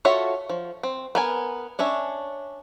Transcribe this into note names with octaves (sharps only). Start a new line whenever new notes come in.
F4 F#4 A4 C#5 E5
F3
C4
B3 A#4 G#5
C#4 D4 C#5 E5